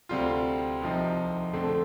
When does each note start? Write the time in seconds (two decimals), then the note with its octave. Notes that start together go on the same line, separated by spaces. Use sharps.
0.09 D2 C3 G3 C4 F4
0.82 C2 C3 F3 C4 D#4
1.53 F2 D3 A3 C4